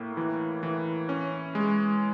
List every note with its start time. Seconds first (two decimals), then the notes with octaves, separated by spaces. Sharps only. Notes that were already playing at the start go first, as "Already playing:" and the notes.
Already playing: A2 A#3
0.17 E3
0.63 E3
1.09 C#4
1.55 G#3